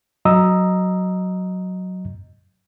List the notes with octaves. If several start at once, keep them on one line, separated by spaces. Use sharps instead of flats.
F#3 D#5 A#5 D#6 E6